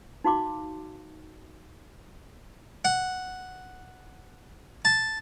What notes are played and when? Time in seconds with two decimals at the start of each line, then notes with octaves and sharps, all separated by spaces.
0.24 D#4 F#4 F5 C6 D6
2.85 F#5
4.85 A5